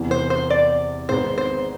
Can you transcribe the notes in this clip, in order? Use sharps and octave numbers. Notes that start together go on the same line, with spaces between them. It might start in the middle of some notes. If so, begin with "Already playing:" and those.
Already playing: E2 C3 E3
C5
C5
D5
G#1 G#2 G#3 B3 C5
C5